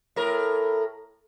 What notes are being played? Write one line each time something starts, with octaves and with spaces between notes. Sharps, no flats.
A2 A#4